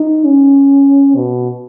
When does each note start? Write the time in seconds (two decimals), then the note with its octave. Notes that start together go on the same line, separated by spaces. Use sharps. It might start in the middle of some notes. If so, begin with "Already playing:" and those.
Already playing: D#4
0.25 C#4
1.16 B2